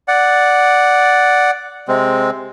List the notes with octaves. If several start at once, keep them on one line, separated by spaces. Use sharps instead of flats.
D5 F#5
C3 G#3 C4